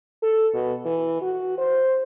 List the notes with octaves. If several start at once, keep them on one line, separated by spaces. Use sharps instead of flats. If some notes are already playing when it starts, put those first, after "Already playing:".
A4
B2
E3
F#4
C5